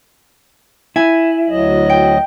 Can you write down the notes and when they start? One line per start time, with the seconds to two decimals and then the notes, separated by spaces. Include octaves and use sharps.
0.96 E4 G#5
1.50 D2 F#3 D#5
1.90 G5